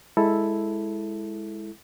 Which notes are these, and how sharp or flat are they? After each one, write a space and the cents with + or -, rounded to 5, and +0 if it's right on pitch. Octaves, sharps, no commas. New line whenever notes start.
G#3 +0 E4 +0 A4 +0